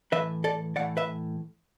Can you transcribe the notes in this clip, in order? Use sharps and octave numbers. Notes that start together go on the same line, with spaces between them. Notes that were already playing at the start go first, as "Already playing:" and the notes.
A2 E3 B4 E5
A4 D5
A2 E3 D5 F#5
B4 E5